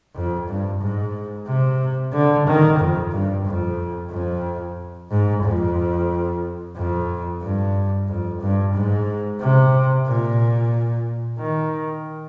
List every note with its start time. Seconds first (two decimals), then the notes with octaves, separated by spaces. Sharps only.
0.15 F2
0.48 G2
0.80 G#2
1.47 C3
2.13 D3
2.47 D#3
2.79 F2
3.12 G2
3.45 F2
4.11 F2
5.10 G#2
5.44 F2
6.76 F2
7.42 G2
8.09 F2
8.41 G2
8.74 G#2
9.40 C3
10.07 A#2
11.39 D#3